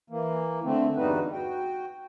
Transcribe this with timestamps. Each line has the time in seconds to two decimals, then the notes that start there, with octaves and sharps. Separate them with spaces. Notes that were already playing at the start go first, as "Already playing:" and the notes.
0.10 E3 A#3
0.64 D3 A3 C4
0.97 E2 G2 G3 D#4 F#4 B4
1.32 F#4 G5